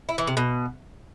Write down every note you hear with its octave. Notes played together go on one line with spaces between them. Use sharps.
E4
E3
C3
B2